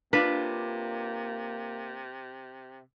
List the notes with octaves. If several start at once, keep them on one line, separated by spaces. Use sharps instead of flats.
C3 A#3 D4 F4 B4 D5